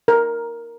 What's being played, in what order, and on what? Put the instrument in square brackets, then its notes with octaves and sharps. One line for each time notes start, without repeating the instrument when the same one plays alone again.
[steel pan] A#4